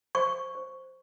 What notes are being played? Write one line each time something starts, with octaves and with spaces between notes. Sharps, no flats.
C5 C#6
C5